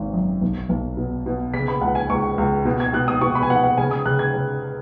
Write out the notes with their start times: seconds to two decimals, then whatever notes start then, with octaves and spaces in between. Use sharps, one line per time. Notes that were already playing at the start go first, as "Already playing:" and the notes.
Already playing: G#1
0.14 F#2
0.41 B1
0.69 B1
0.97 B2
1.26 B2
1.54 C#3 B6
1.68 B5
1.81 C#2 F#5
1.95 G#5
2.09 C#2 C#6
2.38 C#2
2.65 B2
2.80 G#6
2.93 B2 F#6
3.08 D#6
3.21 B2 C#6
3.35 B5
3.43 G#5
3.50 B2 F#5
3.63 F#5
3.78 C#3 G#5
3.91 D#6
4.06 C#3 F#6
4.19 G#6
4.34 C#3